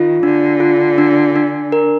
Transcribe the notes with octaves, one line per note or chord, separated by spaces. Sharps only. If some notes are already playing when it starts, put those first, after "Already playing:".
Already playing: D#3 F4
D3 D4
F4
D4
D4
A#4